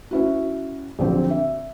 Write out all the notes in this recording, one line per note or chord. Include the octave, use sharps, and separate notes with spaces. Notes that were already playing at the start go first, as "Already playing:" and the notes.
C#4 E4 F#4
A#1 D3 F#3 C4
E5